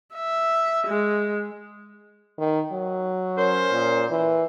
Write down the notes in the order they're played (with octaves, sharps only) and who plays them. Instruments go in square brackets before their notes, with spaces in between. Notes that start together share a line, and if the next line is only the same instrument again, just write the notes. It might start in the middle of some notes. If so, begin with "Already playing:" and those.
[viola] E5
G#3
[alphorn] D#3
F#3
[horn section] C#4 A#4 C5
[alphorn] A#2
E3